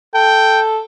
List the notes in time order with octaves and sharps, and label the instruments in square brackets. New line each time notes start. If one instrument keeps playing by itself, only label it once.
[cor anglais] A4 [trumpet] G5